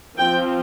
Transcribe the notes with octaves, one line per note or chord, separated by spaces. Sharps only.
F3 C4 F4 G5